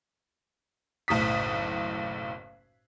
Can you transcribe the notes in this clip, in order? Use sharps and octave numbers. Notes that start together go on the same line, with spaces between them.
F#1 B1 A2 D#6 B6